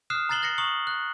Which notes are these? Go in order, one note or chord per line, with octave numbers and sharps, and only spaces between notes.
D#6 F6 F#6 C7 E7
A#5 F#6 A6 C7 F#7 G7
F#6 A6 A#6 C7 C#7
A#5 C#6 D#6 C#7 F#7 G7
F#6